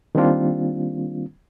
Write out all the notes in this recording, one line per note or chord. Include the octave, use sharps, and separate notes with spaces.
D#3 G3 A#3 C4 D4 F4